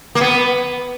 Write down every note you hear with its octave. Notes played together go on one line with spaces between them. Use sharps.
A#3
B3